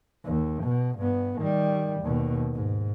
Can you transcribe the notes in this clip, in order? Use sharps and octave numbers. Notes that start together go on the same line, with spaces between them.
D#2
B2
G2 B3
D#3 G3
D#2 B2
G#2